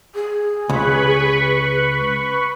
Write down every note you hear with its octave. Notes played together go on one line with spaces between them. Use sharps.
G#4
C#2 B4 B5 C#6